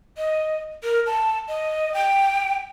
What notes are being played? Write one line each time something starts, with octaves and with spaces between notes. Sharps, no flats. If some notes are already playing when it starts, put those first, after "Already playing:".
D#5
A#4
A5
D#5
G5